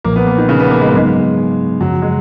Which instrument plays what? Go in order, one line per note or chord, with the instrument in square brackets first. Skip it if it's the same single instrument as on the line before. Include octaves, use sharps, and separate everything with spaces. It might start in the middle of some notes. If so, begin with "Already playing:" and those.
[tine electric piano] B1 A#2 F3 [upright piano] A#3
[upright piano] B3
A#3
D#3
C#3
B3
A#3
G#3
A#3
[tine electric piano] G#2 F#3 B3 D#4 [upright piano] G#3
[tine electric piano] F#2 C#3 F3 [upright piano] F#3
[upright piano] G#3